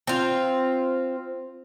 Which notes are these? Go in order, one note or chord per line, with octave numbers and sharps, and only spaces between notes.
C4 F4